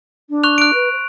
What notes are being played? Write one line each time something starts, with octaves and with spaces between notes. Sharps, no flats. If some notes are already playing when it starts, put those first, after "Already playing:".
D4
C#6 F#6 F7
F#6 D7
B4
C5